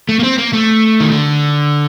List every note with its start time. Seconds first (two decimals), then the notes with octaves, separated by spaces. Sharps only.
0.09 A3
0.19 A#3
0.23 C4
0.38 A#3
0.53 A3
1.00 D#3
1.12 D3